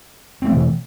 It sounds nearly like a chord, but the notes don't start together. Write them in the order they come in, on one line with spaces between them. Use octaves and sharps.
C4 A3 E3 B2